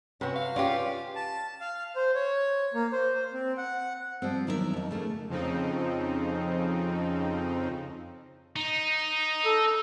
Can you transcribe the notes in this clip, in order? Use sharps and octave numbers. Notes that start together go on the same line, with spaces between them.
C3 C#4 F#4 B4
F5
C#4 F4 G4 D5
A5
F5
C5
C#5
A#3
C5
C4
F#5
F3 G3 C4
E2 D#3 F#3 A#4 C5 E5
F2 D#4
C#3 A3 A#3
F2 C#3 F3 C4 D#4
D#4
A4